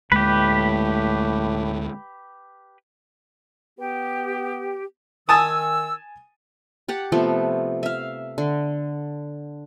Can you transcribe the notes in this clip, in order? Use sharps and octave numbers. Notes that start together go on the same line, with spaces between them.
D2 A2 G#3 A#3 G4 B4
B3 G4
D#3 G#5 A5 D#6 E6
G4 F#5 A5
C3 F3 A3 B3
E5 F5
D3